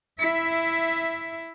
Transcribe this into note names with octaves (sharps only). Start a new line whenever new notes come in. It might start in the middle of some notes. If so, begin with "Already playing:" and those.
E4 E5